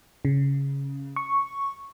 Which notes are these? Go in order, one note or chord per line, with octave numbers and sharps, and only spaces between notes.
C#3
C#6